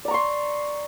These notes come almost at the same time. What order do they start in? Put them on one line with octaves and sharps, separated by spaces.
D5 A#5 C#6 C6